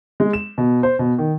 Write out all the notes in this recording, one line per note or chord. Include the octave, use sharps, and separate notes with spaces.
G#3
E7
B2
C5
B2
D#3